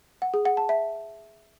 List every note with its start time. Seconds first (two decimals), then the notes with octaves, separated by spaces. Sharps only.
0.22 F#5
0.34 G#4
0.45 F#5
0.57 A5
0.69 E5